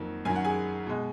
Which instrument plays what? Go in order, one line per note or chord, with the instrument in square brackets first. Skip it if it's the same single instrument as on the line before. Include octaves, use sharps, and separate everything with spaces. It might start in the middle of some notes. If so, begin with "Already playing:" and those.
Already playing: [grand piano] F2 D#3 F#3 A#3
F#2 D#3 F#3 G#5
F#5
G#4 G#5
B2 G#3